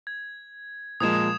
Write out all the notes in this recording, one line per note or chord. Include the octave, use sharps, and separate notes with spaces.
G#6
A#2 F3 G#3 D#6 G#6 E7